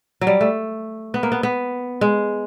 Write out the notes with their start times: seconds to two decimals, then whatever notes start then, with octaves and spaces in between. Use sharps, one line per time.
0.21 F#3
0.27 G3
0.41 A3
1.14 B3
1.23 A#3
1.32 B3
1.43 B3
2.01 G#3